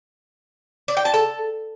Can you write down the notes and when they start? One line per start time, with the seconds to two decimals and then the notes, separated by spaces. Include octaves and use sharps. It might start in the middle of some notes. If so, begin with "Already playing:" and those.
0.88 D5
0.97 G5
1.05 A5
1.14 A4